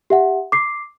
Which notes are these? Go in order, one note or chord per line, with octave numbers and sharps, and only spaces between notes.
G4 E5 F#5
D6 C7